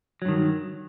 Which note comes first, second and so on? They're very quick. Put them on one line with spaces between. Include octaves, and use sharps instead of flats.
F#3 G2 D#3